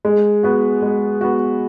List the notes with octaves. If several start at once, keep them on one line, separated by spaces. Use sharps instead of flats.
G#3
B3 F#4
G#3
B3 F#4